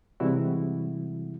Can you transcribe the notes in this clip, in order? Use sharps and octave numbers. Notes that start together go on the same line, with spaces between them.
C3 E3 G3 G#3 E4 F#4